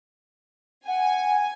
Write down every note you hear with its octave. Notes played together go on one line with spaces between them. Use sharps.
F#5 G#5